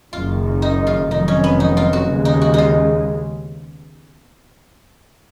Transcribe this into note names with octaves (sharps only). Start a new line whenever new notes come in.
F#1 F#2 D#3 F4
D#4
F4
F1 F2 D#3 F#3 D#4
C#4
B3
D#4
F4
F#4
D#2 C#3 G#3
D#4
F#4
D#4 F4